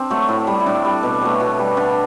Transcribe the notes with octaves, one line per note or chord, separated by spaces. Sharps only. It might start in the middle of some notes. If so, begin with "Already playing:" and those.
Already playing: C4 D4
F#3 A3
A2
G3
E4
A2 D4
G3
B2
F#3 A3
B2
G3
D3